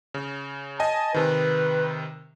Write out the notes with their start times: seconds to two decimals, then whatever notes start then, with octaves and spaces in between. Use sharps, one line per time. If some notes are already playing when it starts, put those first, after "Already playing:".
0.14 C#3
0.80 D#5 G#5 A5
1.14 C3 D#3 B4